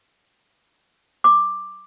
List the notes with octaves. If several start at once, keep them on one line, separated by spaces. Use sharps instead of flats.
D6